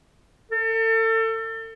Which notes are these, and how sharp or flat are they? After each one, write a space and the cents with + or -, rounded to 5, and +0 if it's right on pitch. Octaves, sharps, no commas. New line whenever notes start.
A4 +35